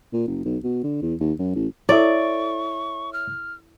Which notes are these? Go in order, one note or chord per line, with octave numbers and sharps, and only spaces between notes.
A#2
F#1
B1
B2
D3
E2
D#2
F#2
A1
E4 A4 C#5 D5 E5 C#6
F6